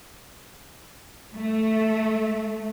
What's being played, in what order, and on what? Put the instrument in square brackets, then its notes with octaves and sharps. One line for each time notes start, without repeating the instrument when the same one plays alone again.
[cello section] A3